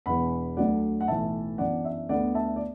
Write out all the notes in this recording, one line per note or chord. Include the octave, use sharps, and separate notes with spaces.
E1 E2 E3 F#5 B5
D2 D3 F#3 A3 D5 F#5
F#5
B1 A2 E3 E5 A5
F#2 E3 B3 D4 D5 F#5
E5
D2 D3 B3 D5 F#5
E5 A5
D5